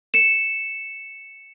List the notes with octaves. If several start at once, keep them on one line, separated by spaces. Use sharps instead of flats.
C#7 E7